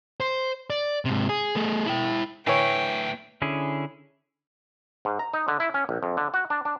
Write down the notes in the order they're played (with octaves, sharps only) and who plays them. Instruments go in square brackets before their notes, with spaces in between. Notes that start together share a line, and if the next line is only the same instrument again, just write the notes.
[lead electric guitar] C5
D5
G#2 C3
G#4
A3 G#4
E4 G5
[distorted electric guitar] A2 D3 [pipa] E3 C#5 [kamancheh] G5
[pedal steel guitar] D3 C#4 E4 G#4
[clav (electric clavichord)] G#2
A#5
D#4
D3
E4
C#4
A#1
F2
D3
F#4
D4
D4